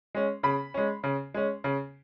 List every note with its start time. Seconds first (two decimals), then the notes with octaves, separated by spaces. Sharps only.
0.15 G#3 C#4
0.43 C#3 B5
0.74 G#3 C#4
1.04 C#3
1.34 G#3 C#4
1.64 C#3